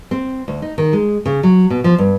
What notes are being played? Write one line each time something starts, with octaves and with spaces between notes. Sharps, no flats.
C4
D2
D#4
D#3
G#3
C#3
F#3
B2
F3
G2